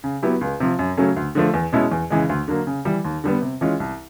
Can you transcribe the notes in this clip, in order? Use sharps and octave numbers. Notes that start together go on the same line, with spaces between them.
C#3
F#3 B3 E4 G4
C#2
C3 F3
F#2
C#3 F#3 A3 C#4
D2
D3 F3 A3
E2
B2 G#3 C#4 E4
E2
C#3 E3 G#3
D2
D3 F#3 A#3
C#3
E3 G3
D#2
D3 G3 B3
C3
E3 G#3 C#4 F4
C2